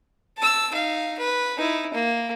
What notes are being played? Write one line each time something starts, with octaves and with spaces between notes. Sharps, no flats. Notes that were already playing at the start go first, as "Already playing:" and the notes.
A5 E6
D#4 F5
B4
D#4 E4
A#3